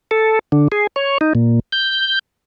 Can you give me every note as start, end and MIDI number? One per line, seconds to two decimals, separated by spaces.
0.11 0.39 69
0.52 0.68 50
0.72 0.87 68
0.96 1.18 73
1.21 1.33 63
1.35 1.60 46
1.72 2.19 91